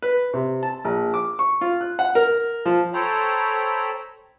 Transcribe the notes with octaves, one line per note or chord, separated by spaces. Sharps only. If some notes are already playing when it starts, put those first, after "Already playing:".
B4
C3
A5
A#1
D6
C#6
F4
F#6
F#5
A#4
F3
A4 C5 C#5 G5 A#5 B5